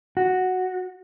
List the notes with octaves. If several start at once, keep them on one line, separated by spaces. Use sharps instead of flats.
F#4